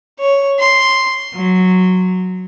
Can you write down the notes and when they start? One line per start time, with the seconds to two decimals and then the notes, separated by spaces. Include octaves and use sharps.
0.19 C#5
0.59 C6
1.35 F#3